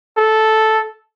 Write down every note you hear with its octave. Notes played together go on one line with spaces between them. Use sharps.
A4